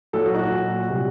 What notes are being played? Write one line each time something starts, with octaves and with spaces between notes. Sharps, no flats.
A#2 F#3 A4
F#4
D#4
F#4
A#2 F#3
C3 G3